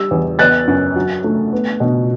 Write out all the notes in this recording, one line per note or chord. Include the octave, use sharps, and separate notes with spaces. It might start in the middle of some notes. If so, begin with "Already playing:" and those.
Already playing: G3 E6
E2
B3 F#6 A6
F#2
F#3
A3
B3
B2